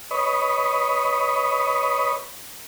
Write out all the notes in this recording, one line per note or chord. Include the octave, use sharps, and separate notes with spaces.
B4 C#5 D#5